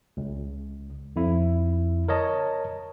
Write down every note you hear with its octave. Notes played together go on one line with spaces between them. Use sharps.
C#2
F2 E4
A#4 C#5 D#5 A5